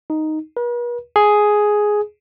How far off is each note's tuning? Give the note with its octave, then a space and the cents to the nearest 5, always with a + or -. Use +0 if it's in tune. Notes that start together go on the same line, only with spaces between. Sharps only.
D#4 +0
B4 -45
G#4 +5